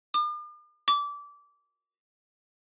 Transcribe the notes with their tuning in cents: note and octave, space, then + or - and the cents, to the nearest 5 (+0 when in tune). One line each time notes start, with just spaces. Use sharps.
D6 +45
D6 -20